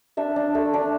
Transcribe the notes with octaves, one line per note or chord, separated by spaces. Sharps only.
D4 E5
D4
A3
D4